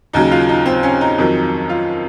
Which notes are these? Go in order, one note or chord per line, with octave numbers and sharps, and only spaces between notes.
D#2 C#3 F#3 D#4
F4
D#4
C4
C#4
D#4
F2 D#3 F#3
F4